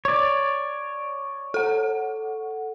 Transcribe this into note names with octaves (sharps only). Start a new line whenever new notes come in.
C#5 D5
A4 F#5